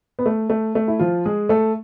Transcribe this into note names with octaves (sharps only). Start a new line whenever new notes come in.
B3
A3
A3
A3
E4
F3 F4
G#3 G#4
A3 A4